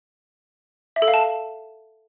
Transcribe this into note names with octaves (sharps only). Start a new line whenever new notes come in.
E5
A4
F5
A5